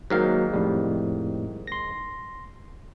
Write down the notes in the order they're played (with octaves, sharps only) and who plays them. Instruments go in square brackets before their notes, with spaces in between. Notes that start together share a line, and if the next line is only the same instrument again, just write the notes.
[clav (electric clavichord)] G#2 D#3 F5 [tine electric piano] F#3 A#3
[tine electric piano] F2 A2 G3
C6 A#6